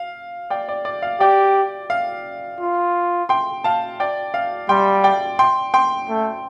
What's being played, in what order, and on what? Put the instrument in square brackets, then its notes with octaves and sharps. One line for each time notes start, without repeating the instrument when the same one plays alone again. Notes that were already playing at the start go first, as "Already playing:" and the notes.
Already playing: [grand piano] F5
D5 G5
D5
D5
F5
[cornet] G4 [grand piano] D5 G5
[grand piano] F5
[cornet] F4
[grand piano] G5 C6
F5 A5
D5 G5
F5
[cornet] G3 [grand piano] G5 C6
[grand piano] D5 G5
G5 C6
G5 C6
[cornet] A3